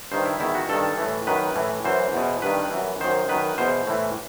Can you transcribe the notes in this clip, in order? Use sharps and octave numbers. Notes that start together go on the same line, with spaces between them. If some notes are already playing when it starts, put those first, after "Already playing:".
G2 D#3 C5
E4
E2 D#3 E4
F#4
G2 D#3 A4
A2 E3
F#2 D#3 B4
A2 E3
F#2 E3 C5
E2 B2
G2 D#3 B4
F#2 E3
F#2 D#3 C5
F#2 D#3 B4
E2 B2 C5
A2 E3